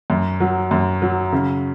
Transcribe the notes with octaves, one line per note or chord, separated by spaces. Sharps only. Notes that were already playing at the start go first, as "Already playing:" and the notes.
F#2
F#3
F#2
F#3
C#3